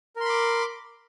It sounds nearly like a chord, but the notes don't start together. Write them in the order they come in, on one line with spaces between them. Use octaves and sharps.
A#4 C6 B5 D6